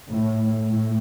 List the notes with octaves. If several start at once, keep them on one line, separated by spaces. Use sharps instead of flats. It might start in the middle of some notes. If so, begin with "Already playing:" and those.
A2
A2